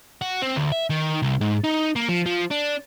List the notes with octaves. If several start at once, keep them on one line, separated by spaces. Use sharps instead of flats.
F#4
C4
D2
E5
D#3
C2
G#2
D#4
A#3
F3
F3
D4